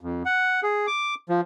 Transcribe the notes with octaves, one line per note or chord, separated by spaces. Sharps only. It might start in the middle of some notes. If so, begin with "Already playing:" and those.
F2
F#5
G#4
D6
F3